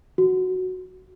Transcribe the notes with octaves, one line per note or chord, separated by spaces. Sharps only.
F#4